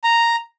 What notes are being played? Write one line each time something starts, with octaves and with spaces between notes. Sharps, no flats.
A#5